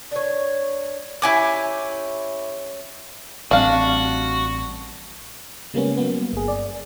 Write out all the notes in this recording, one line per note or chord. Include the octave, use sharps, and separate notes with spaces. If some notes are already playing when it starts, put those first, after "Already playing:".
D4 C#5
C#4 E4 G4 G#5 D6
A1 G3 C4 D4 F#4 F5
C#3 G3 G#3 A#3 B3 C#4
F#3 A#3 B3
G1 G#4
D5